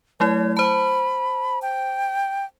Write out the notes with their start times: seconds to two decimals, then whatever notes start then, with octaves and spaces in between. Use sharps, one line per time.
0.20 F#3 A3 E4 C#5
0.57 C5 A5 B5
1.62 G5